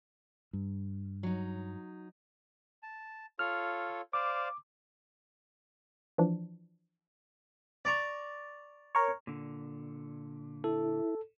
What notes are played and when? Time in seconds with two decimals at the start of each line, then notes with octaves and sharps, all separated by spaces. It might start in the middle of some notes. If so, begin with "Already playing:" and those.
0.53 G2
1.23 F#3 D#4
2.83 A5
3.39 F4 A4 C#5 F6
4.13 C5 D5 F5 D6
6.18 E3 F3 D4
7.85 D5 A#5 C#6
8.95 A#4 C#5
9.27 A#2 D3
10.64 E4 A4